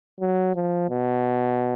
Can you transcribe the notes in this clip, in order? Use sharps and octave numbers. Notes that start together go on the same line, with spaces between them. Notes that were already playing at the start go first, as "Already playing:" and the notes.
F#3
F3
B2